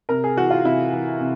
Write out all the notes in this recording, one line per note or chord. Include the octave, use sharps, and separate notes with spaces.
C3 A#4
G#4
E3 F#4
F4
C3 E4
E3
C3